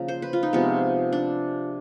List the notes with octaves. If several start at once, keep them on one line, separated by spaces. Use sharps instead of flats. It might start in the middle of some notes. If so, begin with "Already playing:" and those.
Already playing: C#3 F3 A#3
C5
B4
F4
D#4
C3 F3 G#3 B3
D4